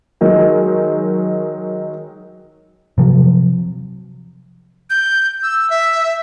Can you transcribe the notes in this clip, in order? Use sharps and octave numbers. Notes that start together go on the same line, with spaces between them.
D#3 F#3 G#3 D#4
C3 F3 F#3
G6
E6
E5